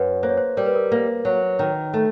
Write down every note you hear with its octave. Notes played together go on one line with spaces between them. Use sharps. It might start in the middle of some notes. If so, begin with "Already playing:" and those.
Already playing: F#2 B4
A#3 C5
C#5
C5
G3 A#4
B4
A#4
A#3
F#3
D#3
A3